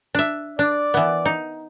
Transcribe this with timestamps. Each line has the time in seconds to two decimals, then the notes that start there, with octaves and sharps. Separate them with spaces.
0.15 D4 E5
0.59 D4 D5
0.94 E3 B3
1.25 D#4